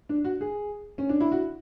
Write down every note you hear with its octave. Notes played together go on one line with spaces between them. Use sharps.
D4
F#4
G#4
C#4
D4
E4
F#4